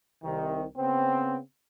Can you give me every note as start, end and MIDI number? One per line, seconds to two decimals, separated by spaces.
0.23 0.64 36
0.23 0.64 48
0.23 0.64 51
0.76 1.38 49
0.76 1.38 59
0.76 1.38 60